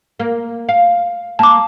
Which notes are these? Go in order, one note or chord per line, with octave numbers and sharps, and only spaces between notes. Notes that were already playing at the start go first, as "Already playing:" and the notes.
A#3
F5
A#3 A5 D6